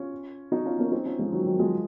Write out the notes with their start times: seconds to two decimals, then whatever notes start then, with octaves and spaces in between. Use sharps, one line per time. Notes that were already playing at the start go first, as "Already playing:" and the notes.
Already playing: C#4 F4
0.52 D#4 F#4
0.66 C#4 F4
0.79 A#3 C#4
0.92 C4 D#4
1.06 C#4 F4
1.19 F3 G#3
1.32 D#3 F#3
1.45 D#3 F#3
1.59 F3 G#3